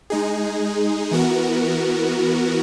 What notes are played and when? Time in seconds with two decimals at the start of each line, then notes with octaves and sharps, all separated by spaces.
0.10 G#3 D#4 G#4
1.11 E3 B3 F#4 A#4